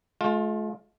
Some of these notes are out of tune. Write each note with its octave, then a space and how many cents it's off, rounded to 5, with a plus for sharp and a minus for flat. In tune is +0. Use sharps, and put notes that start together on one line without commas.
A3 -45 F4 +20